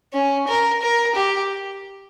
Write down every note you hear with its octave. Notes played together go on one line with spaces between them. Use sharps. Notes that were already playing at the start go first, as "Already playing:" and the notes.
C#4
A#4
A#4
G4